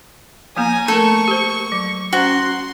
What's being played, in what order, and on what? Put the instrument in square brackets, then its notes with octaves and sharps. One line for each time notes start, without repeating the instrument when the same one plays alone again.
[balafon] F3 A#3 B3 [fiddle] G#5 A#5
[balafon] A3 A#4 [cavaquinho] A4 [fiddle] C#6
[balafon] G4 C5
F#3
[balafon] C#4 C5 [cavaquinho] F#4 [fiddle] C6